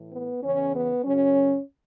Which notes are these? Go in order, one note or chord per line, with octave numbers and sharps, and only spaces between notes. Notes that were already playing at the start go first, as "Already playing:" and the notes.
Already playing: A2 E3
B3
E2 C#3 E3 C#4
B3
F#2 C#3 F#3 C#4